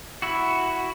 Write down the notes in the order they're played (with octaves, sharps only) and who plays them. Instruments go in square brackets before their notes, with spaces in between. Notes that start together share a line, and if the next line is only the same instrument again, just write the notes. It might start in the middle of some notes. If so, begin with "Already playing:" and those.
[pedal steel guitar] E4 F#4